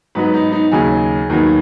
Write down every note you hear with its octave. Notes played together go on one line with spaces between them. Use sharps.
G#2 F#3 B3 B4
D#4
D#4
D#2 C#3 F#3 G#4
D#2 D#3 F#3 B3